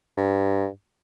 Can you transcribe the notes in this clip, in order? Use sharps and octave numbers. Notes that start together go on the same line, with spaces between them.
G2